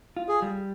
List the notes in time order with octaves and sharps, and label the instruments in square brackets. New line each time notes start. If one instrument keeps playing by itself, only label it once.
[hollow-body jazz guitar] F4
[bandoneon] G#4
[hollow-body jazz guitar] G3